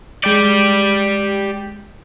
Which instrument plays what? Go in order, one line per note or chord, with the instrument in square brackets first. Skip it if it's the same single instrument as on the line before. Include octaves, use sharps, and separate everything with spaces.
[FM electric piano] G#3 G6 [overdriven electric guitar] G4 D5